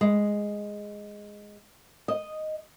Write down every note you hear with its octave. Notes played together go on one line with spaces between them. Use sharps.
G#3
D#5